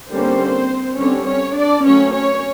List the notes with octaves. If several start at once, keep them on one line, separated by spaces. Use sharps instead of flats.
D3 G3 A#3 C4 C#4 C5
D3 G3 C4 C#4 C#5
C#4 C#5
D4 D5
F#3 A3 C4 C#4 C#5
C#4 C#5